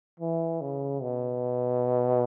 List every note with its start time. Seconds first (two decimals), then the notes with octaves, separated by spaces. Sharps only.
0.20 E3
0.61 C#3
1.02 B2